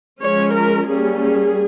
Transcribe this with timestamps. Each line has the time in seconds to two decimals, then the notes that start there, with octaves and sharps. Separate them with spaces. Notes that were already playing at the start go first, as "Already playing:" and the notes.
0.21 F3 G#3 C#4 C#5
0.55 A#4
0.88 G3 A#3 C#4 G#4
1.21 G#4